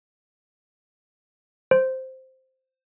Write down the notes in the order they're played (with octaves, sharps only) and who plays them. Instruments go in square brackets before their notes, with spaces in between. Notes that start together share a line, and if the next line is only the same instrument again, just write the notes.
[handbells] C5